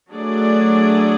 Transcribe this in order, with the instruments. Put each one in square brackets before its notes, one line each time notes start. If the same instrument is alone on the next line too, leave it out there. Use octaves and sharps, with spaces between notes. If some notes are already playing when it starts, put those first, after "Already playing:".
[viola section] F#3 A3 D4 G#4 D5